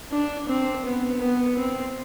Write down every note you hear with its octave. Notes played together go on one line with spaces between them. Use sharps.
D4
C4
B3
B3
C4